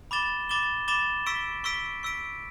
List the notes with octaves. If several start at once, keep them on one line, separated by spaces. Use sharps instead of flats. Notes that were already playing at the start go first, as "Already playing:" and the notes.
B5 D6 A6 E7 G7
B5 D6 A6 E7 G7
B5 D6 A6 E7 G7
C#6 E6 B6 D7
C#6 E6 B6 D7
C#6 E6 B6 D7